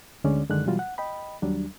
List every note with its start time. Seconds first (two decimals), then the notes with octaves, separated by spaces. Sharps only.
0.24 D2 D3 G#3 C#4 D5
0.50 F#2 D3 D#3 G#3 D4 F#6
0.66 B2 E3 F#3 G3 F4 F#4
0.79 F#5
0.98 D#5 G5 B5
1.42 D#2 F#3 G3 D4